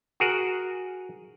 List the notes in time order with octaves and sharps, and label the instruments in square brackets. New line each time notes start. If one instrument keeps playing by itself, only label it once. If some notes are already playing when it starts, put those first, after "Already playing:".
[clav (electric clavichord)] F#4 G#4 A#4 F#5